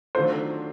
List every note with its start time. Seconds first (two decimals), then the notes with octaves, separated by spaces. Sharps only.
0.15 D#3 F#3 A3 D4 F4 C5